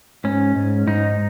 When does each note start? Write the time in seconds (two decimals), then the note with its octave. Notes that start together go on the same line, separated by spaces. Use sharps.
0.24 G#2 C#4
0.56 G#2
0.87 G#2 D#4